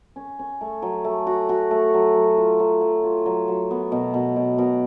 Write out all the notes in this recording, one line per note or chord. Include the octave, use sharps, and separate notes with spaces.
C#4
C#4
A3
F#3
A3
F#4
F#4
A3
F#3
F#3
F4
F#3
F#3
F4
F#3
F#3
B3
B2
B2
B2
B2